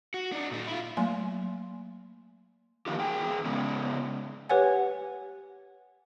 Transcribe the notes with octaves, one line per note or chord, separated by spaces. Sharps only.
F#4
D4 D#4
A#2 D#4
E4 F4
F#3 A3 A#3 G#5 C6
D#3 F3 A#3 D#4 F4 G4
E2 G#4 G5 G#5
C#3 G#3 B3 C#4 G#4
G4 B4 C#5 F#5 G#5